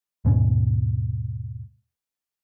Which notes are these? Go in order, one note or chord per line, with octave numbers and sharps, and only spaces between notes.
D#2 G#2 B2 C#4